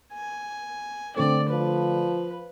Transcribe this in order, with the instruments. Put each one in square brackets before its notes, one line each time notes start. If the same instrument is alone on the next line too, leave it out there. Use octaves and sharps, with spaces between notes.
[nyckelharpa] G#5
[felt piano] D3 A3 [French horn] C4 [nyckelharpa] D5
[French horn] F3 [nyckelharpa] B4